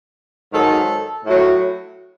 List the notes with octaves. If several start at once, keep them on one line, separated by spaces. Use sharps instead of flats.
G#2 D#3 F#3 A4
A2 F#3